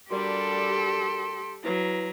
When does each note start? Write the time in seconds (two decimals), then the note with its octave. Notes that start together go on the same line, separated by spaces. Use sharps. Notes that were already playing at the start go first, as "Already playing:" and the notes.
0.11 G3 D4 F#4 G4 A4 A#4 D5 C6
1.64 F#3 E4 B4 A#5 C7